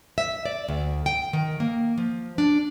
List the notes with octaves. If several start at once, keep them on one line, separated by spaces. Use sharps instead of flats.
E5
D5
D2
G5
D#3
A#3
F3
D4